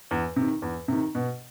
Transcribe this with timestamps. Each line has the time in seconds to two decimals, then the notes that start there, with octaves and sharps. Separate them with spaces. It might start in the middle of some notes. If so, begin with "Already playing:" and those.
0.11 E2
0.36 C3
0.42 D#3
0.62 E2
0.88 C3 D#3
1.15 B2